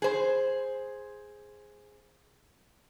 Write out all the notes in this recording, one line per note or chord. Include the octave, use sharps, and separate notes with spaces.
G#4 C5